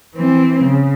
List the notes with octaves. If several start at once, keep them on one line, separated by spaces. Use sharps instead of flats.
E3 C4
C#3